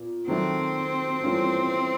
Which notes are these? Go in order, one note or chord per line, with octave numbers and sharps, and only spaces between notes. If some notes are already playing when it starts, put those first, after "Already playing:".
Already playing: A#2 B3
D#3 F#3 A3 C4 D4
G2 E3 A3 C#4 F4